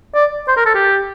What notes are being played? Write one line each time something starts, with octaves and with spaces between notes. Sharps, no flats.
D5
C5
A#4
A4
G4